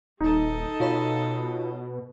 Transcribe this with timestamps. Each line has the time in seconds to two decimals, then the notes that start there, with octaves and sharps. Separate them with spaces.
0.20 D#1 D#4 G#4 A4 D#5
0.80 B2 F4 C#5 B5